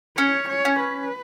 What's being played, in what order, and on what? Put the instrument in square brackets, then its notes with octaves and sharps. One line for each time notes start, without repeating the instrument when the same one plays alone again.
[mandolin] C#4 [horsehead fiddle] C#5
[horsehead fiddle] C#5
[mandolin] C#4
[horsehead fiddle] B4